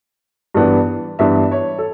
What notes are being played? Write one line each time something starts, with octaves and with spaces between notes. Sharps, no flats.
G2 E3 B3 D4
G2 E3 B3 D4 E5
C#5
A4